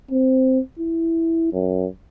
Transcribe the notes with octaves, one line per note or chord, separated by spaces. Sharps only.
C4
E4
F#2